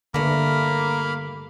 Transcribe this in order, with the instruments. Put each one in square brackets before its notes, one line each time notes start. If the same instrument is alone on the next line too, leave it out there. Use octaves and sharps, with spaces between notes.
[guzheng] G2 A3 [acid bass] D3 [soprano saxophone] A#3 [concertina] B5 F6